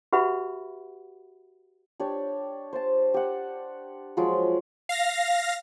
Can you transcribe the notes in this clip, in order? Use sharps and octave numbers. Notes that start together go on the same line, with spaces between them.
F#4 G4 B4 E5 F#5 B5
D4 G4 C#5
C5 A5
G4 F#5
F3 F#3 G#3
F5 A#6